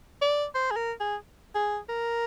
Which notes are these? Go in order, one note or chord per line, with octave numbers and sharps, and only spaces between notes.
D5
C5
G#4
A#4
G#4
G#4
A#4